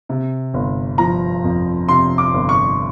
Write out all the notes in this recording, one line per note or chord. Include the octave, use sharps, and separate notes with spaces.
C3
G1
F3 A#5
F2
C3 C6
D6
G1
C#6